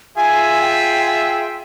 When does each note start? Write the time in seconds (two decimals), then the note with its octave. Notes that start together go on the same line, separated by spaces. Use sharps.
0.16 F4 G#4 E5 G#5
0.61 G5
1.06 G5